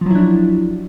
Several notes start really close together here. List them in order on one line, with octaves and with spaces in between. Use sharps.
F3 F#3 E4 D4